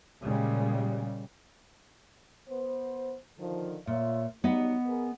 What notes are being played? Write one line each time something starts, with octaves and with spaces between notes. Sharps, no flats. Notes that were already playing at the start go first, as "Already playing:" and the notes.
A#2 C#3 G3 G#3
B3 C5
D3 D#3 F3
A#2 F4 C#5 E5
F#3 G3 B3 D#4 D#5 F#5
G#4 A#4 B4